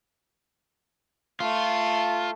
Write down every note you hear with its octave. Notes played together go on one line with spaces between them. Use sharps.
A3 F4